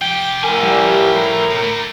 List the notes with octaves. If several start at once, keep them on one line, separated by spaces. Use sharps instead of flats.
F3 G4 G5
A2 A#4 G#5
G3
A#5
B2
D3 A3